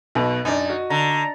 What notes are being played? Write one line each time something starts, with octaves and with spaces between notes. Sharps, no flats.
B1 B2 B4
F#2 D4 D#4 D5
F#4
D3 A#5